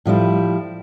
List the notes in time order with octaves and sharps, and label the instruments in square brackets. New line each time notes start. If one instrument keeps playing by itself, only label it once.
[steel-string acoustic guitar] A2 F3 G3 E4